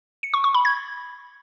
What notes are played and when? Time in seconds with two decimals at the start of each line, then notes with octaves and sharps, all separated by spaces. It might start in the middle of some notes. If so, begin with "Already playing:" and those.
0.23 C#7
0.34 C#6
0.44 C#6
0.54 B5
0.65 G#6